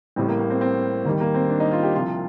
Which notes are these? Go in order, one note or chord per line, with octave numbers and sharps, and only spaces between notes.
A1 A2 G3 C4
A#3
A#3
C4
C4
D#2 D#3 G3 A#3
A#3
C4
D4
D#4
F4
G4
C2 C3 F3 F4